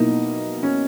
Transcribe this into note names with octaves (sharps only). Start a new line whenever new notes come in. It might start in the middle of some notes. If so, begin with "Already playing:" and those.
Already playing: B2 A#3 D#4 E4 A#4
C#4